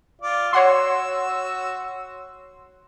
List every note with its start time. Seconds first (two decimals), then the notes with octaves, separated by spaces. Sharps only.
0.21 F4 D5
0.53 F#4 C#5 F#5 C6 E6